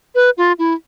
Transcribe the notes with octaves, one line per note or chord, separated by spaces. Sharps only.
B4
F4
E4